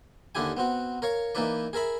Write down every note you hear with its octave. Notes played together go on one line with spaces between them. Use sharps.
D#2 D3 D4 E4 G4 G#5
B3 C4 F#4
A#4 C#5 F5 C#6
E3 A#3 D#4 E4 B4 D5
G#4 A#4 E5 B5